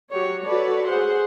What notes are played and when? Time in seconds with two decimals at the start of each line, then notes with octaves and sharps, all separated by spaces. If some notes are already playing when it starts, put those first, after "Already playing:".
0.11 F#3 F#4 G4 C#5
0.45 F#4 A4 B4 C#5 D5
0.87 G#4 C5 F#5 C6